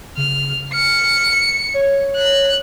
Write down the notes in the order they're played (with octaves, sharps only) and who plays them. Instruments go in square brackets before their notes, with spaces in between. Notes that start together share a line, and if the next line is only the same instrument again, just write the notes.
[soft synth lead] C#3 [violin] F6
[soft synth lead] F6 [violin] C#7
[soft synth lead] C#5
[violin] F#6